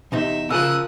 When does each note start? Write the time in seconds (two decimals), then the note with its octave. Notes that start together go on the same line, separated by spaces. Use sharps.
0.12 E2 C3 D#4 E5
0.50 C#3 F3 A#4 F5 D#6 E6 F#6